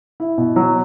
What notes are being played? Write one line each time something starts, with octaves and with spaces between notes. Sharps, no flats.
E4
B2
F#3